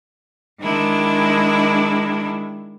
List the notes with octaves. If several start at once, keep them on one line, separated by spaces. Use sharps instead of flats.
D#3 G#3 D4 E4